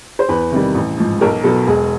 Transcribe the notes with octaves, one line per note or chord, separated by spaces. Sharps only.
C5
E2 B4
C3 D#3 G3
A1
G#2 F3
B1 A#4
B2 F#3 A4
E1 G#4